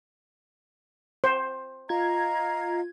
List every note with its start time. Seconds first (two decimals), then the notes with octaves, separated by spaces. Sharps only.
1.24 C5
1.89 F4 D#5 F5 A#5 G#6